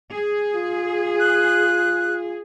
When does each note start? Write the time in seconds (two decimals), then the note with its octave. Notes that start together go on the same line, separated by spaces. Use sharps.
0.13 G#4
0.55 F4
1.20 F#6